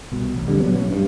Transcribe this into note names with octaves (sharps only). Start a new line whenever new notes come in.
C2 B2
A1
F2 D3 G3
A#2 F#3 B3
B1 A2 C#4
G2